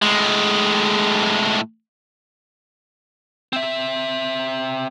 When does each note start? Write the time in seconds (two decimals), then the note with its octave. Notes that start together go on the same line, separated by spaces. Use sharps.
0.03 A2 G#3
3.53 C4 E5